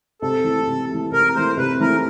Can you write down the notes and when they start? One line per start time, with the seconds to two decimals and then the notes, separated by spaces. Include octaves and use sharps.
0.22 C3 A4
0.44 E3
0.49 A3
0.67 C3
0.90 E3 A3
1.12 C3 A#4
1.35 E3 A3 C5
1.57 C3 B4
1.80 E3 A3 A#4